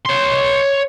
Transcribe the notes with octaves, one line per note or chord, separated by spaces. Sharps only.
C#5 C6